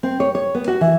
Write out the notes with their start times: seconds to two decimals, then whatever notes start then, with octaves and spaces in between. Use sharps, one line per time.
0.03 C4
0.20 C#5
0.35 C#5
0.55 B3
0.68 F#4
0.81 E3